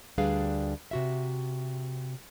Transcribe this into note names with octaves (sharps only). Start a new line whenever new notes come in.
D2 G3 D4 G#4 B4 F5
C3 F#4 E5